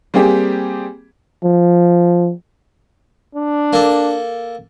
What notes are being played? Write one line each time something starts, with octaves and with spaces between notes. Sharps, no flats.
G3 A#3 C4 G4 G#4
F3
D4
A#3 A4